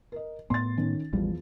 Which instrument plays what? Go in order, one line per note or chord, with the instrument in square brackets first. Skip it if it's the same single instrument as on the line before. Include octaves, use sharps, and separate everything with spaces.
[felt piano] A#4 D#5
[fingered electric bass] A2 B3 [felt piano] C6 A6
[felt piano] D#3 C#4
[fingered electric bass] A1 G3 [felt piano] E2 F3